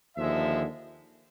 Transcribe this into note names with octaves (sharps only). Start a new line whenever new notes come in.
D#2 D3 F3 G#3 E5